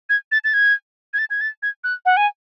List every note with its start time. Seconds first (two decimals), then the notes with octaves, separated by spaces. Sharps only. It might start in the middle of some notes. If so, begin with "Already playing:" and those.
0.09 G#6
0.32 A6
0.44 A6
0.54 G#6
1.14 G#6
1.18 A6
1.30 G#6
1.41 A6
1.62 G#6
1.84 F#6
2.05 F#5
2.17 G#5